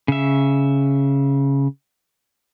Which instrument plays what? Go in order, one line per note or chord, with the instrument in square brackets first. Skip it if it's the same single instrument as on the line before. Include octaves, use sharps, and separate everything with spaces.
[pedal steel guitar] C#3 E5